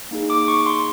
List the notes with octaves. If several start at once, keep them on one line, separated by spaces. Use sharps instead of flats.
A#3 D#4 G#4
D6
C#6
C6